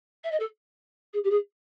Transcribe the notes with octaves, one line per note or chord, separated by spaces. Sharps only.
E5
D#5
A4
G#4
G4
G#4